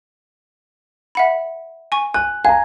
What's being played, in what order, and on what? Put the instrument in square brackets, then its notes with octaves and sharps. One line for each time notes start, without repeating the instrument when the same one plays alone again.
[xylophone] E5 F#5 B5
G#5 C#6
[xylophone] G#5 [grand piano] F#6
[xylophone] F5 [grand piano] G#5 A#5